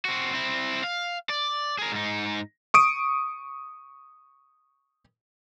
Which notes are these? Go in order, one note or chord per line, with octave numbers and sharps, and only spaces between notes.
C4 F#4
C4 E4
F5
D5
G#4 A#4
G#2 D#4
C#6 D#6 D7